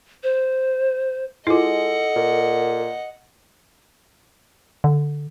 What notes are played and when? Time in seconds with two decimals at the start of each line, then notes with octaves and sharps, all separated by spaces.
0.23 C5
1.47 G#3 E4 F4 A4 D#5 F#5
2.16 A#2
4.84 D3